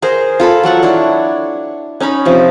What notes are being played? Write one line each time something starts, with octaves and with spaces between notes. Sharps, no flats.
G#4 A#4 C5
F4 A4 B5
F#3 A4 F#5 C#6
D4 E4 C#5
C#4 D#4 A#5 B5
C3 F3